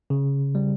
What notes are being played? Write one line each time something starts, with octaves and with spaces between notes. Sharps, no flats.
C#3
G3